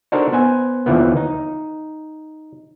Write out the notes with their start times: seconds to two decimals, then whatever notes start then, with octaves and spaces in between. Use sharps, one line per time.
0.12 D4 D#4 F#4 A4 A#4 C5
0.33 B3 C5 G#5
0.86 D#2 D3 E3 F3 B3
1.17 D#4